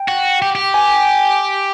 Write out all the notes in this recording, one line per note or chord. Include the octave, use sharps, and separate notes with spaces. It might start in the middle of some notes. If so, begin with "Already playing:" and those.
Already playing: G5
F#4
G4
G4
G#5